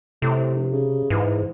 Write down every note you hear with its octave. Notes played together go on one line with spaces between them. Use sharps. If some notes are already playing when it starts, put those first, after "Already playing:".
A2 C3
F1
C#3
G#2 E3